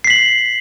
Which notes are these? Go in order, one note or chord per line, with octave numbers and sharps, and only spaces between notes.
B6 C7 F#7